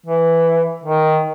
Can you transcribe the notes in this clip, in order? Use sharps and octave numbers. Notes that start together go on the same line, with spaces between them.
E3
D#3